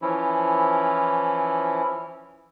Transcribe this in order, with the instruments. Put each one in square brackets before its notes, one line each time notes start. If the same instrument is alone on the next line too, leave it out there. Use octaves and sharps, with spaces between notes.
[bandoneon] E3 F3 C#4 E4